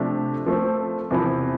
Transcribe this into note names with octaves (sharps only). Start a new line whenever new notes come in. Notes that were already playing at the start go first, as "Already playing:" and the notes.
Already playing: C3 F3 A3 D4 G4
F3 A3 C4
E2 C3 F3 C4 E4